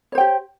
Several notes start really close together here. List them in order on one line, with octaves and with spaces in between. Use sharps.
C#5 C5 G5 G4